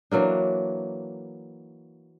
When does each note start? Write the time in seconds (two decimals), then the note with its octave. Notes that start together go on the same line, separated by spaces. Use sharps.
0.11 E3 F#3 A#3 D4